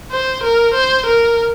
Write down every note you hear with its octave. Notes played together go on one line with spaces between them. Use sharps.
C5
A#4
C5
A#4